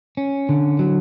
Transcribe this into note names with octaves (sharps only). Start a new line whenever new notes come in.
C#4
D3
F#3